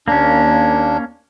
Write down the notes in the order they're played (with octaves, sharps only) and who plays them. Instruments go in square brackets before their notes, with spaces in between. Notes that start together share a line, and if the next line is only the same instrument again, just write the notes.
[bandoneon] D#2 D4 [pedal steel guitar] A#3 C#4